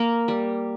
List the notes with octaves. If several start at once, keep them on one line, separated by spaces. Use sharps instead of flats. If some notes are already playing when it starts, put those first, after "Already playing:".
Already playing: A#3
G3